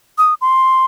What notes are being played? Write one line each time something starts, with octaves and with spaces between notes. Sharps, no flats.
D#6
C6